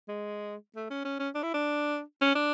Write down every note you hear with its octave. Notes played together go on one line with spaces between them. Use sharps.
G#3
A3
C#4
C#4
C#4
D4
E4
D4
C#4
D4